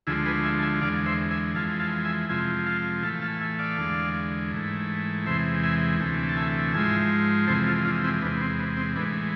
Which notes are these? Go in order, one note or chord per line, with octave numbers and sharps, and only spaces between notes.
D2 D3 F3 G#3 E4 G#4
G#4 B4
E5 G#5
A5
E5 G#5
E2 D3 G#3 D5 F5
C5 E5
E5 G#5
F2 E3 G#3 F5 A5
F5 A5
E5 G#5
F2 C3 F3 G#3 E5 G#5
F5 A5
A2 E3 A3 F5 A5
F5 A5
E5 G#5
D5 F5
E2 D3 G#3
G#2 E3 A3
E2 C3 E3 G#3 C5 E5
E5 G#5
D2 C3 E3 A3
A5
E5 G#5
G#2 F3 G#3 E5 G#5
F2 C3 E3 G#3 A4 C5
F4 A4
D4 F4
C4 E4
E2 C3 G#3 B3 D4
B3
C4
B3
C4
A2 E3 G#3 B3 D4